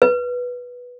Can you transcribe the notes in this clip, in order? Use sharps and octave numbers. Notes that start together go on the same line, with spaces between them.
B4